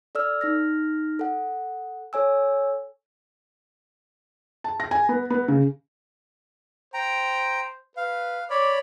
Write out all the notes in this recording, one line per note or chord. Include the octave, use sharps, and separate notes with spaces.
A4 D5 E6 F6
D#4 F6 A#6
A4 F#5
A4 C#5 G#5 E6
A5
A#6
G#5
B3
B3
C#3
C5 G5 A#5
B4 F5
C#5 D5 B5 D6